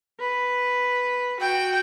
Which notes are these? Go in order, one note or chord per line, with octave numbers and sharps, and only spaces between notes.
B4
F#4 G5